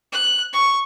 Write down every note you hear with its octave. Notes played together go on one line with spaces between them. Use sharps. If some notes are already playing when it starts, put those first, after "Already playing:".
F#6
C#6